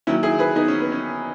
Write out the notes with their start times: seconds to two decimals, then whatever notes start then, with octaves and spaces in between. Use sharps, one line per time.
0.07 D#2 D#3 F#3 C#4 E4
0.23 E4 G#4
0.39 G#4 B4
0.55 B3 D#4
0.68 C#4
0.80 B3
0.92 C#4